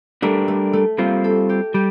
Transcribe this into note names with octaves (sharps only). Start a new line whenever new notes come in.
G3 A3 D4 G4 A#4
A3
A3
G3 A#3 C4 F4
A4
G4
G3 G4